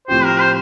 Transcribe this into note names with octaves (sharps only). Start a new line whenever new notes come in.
A2 F3 C4 G4 C5
A#4
C5